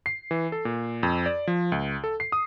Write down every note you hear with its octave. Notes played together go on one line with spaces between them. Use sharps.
C7
E3
A4
A#2
F2
D5
F3
C#2
A4
C7
D#6